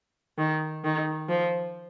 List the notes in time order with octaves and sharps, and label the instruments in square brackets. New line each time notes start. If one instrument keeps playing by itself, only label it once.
[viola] D#3
D#3
F3